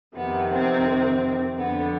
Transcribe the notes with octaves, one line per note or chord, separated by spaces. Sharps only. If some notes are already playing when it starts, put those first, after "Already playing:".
F2 C3 D#3 B3
C4
F2 D3 B3